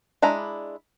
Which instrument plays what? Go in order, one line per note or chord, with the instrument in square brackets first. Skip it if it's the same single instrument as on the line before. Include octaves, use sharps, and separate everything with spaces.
[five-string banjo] G#3 D4 E4 A#5